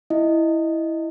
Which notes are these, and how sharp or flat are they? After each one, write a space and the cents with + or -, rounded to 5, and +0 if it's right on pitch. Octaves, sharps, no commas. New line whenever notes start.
E4 -5 D#5 -5